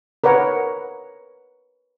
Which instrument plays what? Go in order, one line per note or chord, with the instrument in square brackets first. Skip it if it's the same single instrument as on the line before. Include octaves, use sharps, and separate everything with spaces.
[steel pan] A#4 B4 C#5 F#5